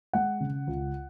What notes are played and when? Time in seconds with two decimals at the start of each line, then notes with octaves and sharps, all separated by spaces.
0.13 G#3 F#5
0.40 C#3
0.67 C#2